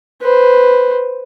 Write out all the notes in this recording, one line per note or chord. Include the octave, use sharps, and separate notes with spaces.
B4 C5